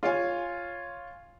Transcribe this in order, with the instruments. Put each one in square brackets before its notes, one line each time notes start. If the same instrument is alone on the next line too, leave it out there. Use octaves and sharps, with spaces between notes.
[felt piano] F4 C#5 G#5